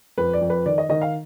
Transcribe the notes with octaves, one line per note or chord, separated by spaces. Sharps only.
F2 B4
D5
F2
B4
D#3 D5
D#5
D#3 D#5
F5